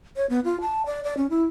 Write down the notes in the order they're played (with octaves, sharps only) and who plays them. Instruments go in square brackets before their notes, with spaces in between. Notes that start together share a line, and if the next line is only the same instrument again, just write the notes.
[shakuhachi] C#5
B3
F4
A5
D5
D5
C#4
E4